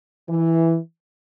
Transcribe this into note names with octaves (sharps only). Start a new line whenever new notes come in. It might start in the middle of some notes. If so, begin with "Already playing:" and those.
E3